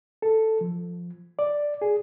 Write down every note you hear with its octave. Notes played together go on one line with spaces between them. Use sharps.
A4
F3
D5
G#4